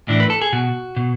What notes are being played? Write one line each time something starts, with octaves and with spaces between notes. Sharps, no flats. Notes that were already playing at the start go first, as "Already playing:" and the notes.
A2 E3 D4
B4
A4
G#4
B2 F#4
B2